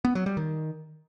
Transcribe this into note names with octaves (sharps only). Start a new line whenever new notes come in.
B3
F#3
G3
D#3